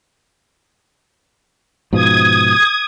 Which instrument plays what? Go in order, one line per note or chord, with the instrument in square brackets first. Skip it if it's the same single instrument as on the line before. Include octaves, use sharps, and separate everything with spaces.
[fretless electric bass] G#2 B2 F3 [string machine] D#6 G#6